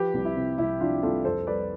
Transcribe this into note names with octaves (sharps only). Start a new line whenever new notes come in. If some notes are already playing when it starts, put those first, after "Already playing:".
Already playing: F3 G4 B4
C2
E4
C3
C2 E4
F3 D4 F4
C2 F4 A4
F2 A4 C5
G3 B4 D5